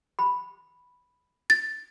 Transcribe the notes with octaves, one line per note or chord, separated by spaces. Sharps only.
B5
A6